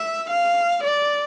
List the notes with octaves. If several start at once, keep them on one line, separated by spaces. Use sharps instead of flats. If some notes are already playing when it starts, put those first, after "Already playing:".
Already playing: E5
F5
D5